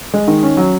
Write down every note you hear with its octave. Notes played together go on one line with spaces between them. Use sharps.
G#3
D#3
C#4
F#3